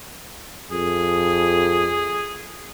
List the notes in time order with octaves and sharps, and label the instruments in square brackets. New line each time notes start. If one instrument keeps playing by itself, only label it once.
[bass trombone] F2 [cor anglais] G#4